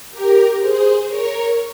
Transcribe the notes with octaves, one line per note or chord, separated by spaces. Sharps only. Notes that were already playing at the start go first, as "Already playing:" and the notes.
G4 A#4
G#4 C5
A#4 C#5